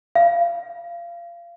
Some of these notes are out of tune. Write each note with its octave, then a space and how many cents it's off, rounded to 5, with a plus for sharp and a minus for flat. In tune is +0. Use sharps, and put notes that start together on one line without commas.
F5 -25